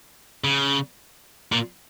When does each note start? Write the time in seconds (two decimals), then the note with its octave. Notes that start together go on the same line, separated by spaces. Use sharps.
0.44 C#3
1.52 A#2